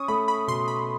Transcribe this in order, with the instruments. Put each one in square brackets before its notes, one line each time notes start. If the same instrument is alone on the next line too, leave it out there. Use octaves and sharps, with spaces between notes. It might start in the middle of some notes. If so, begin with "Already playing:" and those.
Already playing: [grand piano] C#4 [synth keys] C#6 D#6
[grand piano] A3 [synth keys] B5
[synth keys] B5
[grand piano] B2 [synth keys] C6
[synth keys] B5